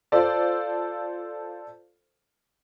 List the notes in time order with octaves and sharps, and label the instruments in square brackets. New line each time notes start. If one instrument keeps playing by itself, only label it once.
[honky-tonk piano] F4 A4 C5 D5